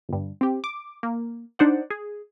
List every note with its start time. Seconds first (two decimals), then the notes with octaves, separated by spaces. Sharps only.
0.09 G1 G2
0.41 C4 G4
0.64 D6
1.03 A#3
1.59 D4 D#4 C5 D5 F#5
1.90 G#4